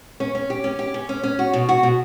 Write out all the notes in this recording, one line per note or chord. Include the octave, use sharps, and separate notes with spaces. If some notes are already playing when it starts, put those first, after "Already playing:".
C#4
C#4
G4
C#4
G4
C#4
C#4
C#4
F#4
B2
F#4
B2